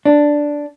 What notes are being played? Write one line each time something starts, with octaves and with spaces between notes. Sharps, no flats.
D4